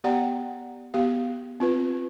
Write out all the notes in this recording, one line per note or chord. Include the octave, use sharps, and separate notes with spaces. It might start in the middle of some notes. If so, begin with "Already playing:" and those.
B3 G4 D5 F#5 G5 A#5
B3 G4 F5
C4 F4 B4